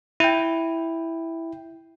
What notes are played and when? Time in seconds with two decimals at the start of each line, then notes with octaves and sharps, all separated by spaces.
0.20 E4 G5